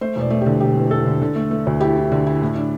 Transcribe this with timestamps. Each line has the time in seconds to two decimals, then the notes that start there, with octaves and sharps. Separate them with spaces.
0.01 A3 C5
0.16 E1 D5
0.30 A3
0.41 D3 G4
0.60 E1 G4
0.75 E2
0.91 E2 A4
1.06 D3
1.21 D3
1.36 A3
1.51 A3
1.67 D2
1.80 E4 G4
1.97 E4
2.12 D3
2.27 E4
2.42 A2
2.56 D4